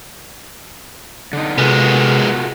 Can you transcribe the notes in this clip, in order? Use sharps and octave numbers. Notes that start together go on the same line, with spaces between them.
D3 D#4
C3 G#3 B3 F4 F#4 A4 A#4 G#5